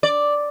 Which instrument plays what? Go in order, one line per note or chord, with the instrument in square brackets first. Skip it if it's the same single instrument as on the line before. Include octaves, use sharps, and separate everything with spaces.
[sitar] D5